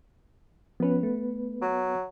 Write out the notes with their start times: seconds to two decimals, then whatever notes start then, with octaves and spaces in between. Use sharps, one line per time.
0.80 F3 B3 C#4 B4
1.03 A3
1.62 F#3